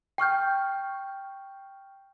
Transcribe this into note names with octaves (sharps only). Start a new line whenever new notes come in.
G5 C#6 F6 G6